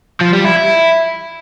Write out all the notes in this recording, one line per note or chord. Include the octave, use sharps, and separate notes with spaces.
F3
G3
E4
E4